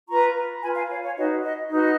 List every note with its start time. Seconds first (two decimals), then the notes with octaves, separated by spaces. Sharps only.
0.09 F4 B4 A#5 C#6
0.62 F4 B4 G#5 B5
0.76 F5 G#5
0.89 C#5 F5
1.03 C#5
1.17 D#4 F#4 B4 D#5
1.43 D#5
1.71 D#4 F#4 B4 D#5